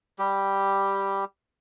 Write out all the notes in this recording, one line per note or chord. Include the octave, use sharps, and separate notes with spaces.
G3 G4